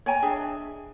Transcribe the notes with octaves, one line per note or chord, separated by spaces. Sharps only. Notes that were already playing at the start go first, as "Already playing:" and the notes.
C#5 G5 G#5 A#5
D4 G#4 D#5 E5